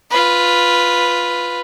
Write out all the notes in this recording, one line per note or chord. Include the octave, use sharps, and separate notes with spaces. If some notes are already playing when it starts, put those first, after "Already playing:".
F4 B4